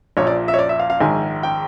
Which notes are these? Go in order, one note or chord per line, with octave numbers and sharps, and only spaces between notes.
A#1 A#2 F3 C#5
D5
E5
C#5
D5
E5
F5
F5
A#1 G#2 D#3 G#5
G5